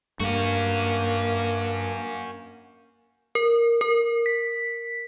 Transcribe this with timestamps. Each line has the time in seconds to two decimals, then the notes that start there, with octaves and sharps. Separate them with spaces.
0.20 G2 A#3 C#4 F#4
3.35 A#4
3.81 A#4
4.26 B6